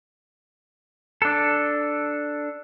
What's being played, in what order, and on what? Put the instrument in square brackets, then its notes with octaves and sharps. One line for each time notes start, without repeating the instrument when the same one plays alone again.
[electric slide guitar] D4 A4